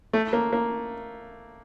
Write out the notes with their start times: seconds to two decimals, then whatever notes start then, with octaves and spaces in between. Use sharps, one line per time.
0.13 A3
0.33 A#3
0.53 A#3